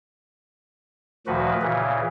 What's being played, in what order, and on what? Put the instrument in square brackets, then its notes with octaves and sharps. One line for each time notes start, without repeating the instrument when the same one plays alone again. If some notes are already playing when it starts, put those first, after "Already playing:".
[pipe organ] D2 A#2 D#3 F3 F#4 B4
A#2 C#3 E3